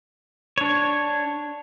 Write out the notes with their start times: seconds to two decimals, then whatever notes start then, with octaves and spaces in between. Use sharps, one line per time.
0.58 D4 C#5